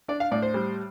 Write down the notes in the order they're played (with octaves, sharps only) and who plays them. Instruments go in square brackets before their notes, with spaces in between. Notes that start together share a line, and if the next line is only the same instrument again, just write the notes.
[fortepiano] D4 D5
F5
A2 D5
C5
G3